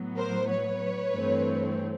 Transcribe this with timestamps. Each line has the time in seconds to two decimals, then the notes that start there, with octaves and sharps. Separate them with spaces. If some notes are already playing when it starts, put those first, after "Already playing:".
Already playing: A2 F#3 B3
0.16 A#4 C5
0.48 B4 C#5
1.11 G2 E3 A3 C4